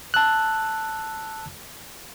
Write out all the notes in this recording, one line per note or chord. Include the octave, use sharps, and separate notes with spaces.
A5 E6 F#6